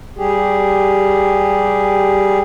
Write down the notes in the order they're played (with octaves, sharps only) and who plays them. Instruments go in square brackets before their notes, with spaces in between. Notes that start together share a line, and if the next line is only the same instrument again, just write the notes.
[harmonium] G3 G4 G#4